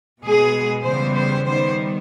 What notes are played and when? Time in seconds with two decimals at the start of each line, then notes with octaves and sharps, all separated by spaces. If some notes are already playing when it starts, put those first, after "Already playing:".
0.23 B2 G#3 B3 G#4
0.86 C#3 E3 G3 B3 C5
1.17 C5
1.48 D#3 G3 B3 C5